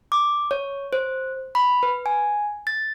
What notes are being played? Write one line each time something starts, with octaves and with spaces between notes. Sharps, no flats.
D6
C#5
C5
B5
B4
G#5
A6